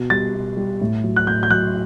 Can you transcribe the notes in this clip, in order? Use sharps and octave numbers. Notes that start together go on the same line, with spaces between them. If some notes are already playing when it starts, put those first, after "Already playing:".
Already playing: B2
G3 A6
B2
G3
A2
F#3
F#6
A2 G6
G6
F#3 F#6